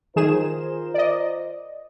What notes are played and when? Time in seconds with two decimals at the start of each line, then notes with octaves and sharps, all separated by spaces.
0.16 D#3 F4 G#4 A#4 C5 E7
0.94 D5 D#5